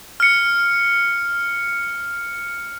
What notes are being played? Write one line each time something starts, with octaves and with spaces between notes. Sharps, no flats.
F6 C#7